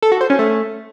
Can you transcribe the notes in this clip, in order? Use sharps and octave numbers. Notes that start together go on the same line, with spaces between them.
A4
F#4
C5
C#4
A3